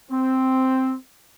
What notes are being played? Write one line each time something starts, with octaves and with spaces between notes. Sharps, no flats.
C4